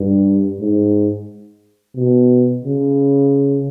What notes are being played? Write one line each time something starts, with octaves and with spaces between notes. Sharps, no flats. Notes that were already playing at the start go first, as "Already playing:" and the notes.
Already playing: G2
G#2
B2
C#3